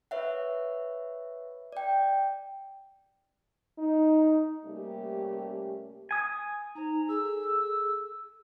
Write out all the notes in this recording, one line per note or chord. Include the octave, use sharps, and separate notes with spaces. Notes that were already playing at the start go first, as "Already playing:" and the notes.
B4 C#5 E5 F#5
D5 G5
D#4
C3 G3 A3 A#3 C#4 G4
G#5 D#6
D#4 C5 A#5
G#4 A4 E6